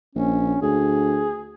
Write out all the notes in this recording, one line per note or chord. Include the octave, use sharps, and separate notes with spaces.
A#1 C#4
D2 G#4